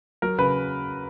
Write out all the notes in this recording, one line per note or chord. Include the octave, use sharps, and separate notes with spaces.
F#3 A#4
C#3 B4